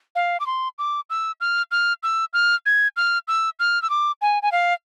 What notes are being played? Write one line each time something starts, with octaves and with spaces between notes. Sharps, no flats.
F5
D6
C6
D6
E6
F6
F6
E6
F6
G#6
F6
E6
F6
E6
D6
G#5
G#5
F5